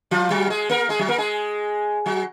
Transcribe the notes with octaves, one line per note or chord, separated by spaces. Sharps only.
F3 F4
F#3 F#4
G#3 G#4
A#3 A#4
G#3 G#4
F#3 F#4
A#3 A#4
G#3 G#4
F#3 F#4